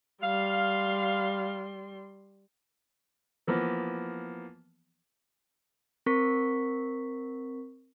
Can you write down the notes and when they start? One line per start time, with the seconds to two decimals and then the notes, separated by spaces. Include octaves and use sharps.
0.23 G3 F5 C6
3.47 E3 F3 A#3 B3
6.06 C4 A#4 C#6 B6